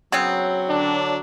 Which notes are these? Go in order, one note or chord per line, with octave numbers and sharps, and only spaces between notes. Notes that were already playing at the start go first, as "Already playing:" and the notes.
C#3 F#3 B3 C4
D3 D4